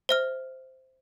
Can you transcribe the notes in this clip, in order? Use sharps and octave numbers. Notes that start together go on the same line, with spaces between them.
C5 E5 F6